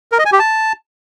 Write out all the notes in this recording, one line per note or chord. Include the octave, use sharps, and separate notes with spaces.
A#4
D#5
G#5
G4
A5